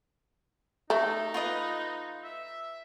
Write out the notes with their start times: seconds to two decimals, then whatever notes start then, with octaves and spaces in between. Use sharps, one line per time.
0.90 A3 D#4
1.34 F4 B4 D#5
2.24 E5